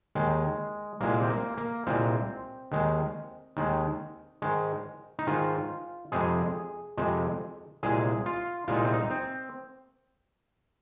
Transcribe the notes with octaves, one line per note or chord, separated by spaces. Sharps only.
D#2 D#3 G#3
C2 A#2 G#3 A#3
C4
A#3
A#3
C2 A#2 G#3 C4
D#2 D#3 G#3
D#2 D#3 G#3
G#2 D#3 G#3
D#4
G#2 D#3 G#3 F4
F2 C3 G#3 G#4
F2 C3 G#3
C2 A#2 G#3 G#4
F4
C2 A#2 G#3 F4
D#4
C4
D#4
C4